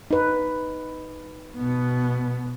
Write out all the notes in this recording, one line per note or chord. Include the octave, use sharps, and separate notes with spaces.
D#4 B4
B2 B3